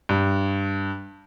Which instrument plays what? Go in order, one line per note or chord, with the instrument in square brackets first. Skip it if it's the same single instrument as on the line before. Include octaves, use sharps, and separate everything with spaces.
[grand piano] G2